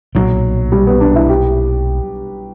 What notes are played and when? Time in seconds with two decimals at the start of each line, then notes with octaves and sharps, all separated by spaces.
0.15 B1 A#2 F#3 A#3
0.72 G3
0.87 B3
1.00 D4
1.16 E4
1.29 G4